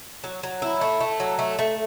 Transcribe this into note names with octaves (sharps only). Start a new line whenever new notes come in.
F#3
F#3
E4
A3
A3
F#3
A3
A3